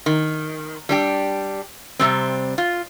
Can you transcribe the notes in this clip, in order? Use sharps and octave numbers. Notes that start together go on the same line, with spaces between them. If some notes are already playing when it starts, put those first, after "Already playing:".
D#3
G3 D4 G4
C3 G3 C4
F4